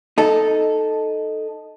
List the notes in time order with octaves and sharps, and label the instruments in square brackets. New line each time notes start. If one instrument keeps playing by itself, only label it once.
[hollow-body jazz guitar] D#4 A4